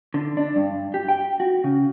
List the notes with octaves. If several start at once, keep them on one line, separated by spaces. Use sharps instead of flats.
D3
D4
G2
G4
G5
F#4
C#3